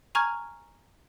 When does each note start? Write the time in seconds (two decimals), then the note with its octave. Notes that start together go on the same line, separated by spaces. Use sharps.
0.15 G#5 A#5 C#6 F6 G#6